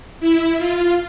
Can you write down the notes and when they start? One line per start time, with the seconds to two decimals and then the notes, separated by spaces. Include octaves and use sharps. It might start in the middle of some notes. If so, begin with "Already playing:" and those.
0.20 E4
0.58 F4